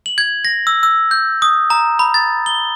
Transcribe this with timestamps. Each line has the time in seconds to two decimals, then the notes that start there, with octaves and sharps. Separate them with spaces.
0.06 F#7
0.18 G#6
0.45 A#6
0.67 E6
0.83 E6
1.11 G6
1.42 D#6
1.70 A#5
1.99 B5
2.14 A6
2.46 G7